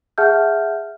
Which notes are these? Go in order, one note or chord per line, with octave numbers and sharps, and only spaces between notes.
G#4 E5 F#5 A5 F6 G6